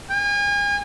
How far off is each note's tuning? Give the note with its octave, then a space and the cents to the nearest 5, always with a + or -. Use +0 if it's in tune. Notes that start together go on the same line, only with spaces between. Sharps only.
G#5 -40